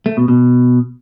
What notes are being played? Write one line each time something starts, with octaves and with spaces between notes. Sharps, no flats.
A3
B2
B2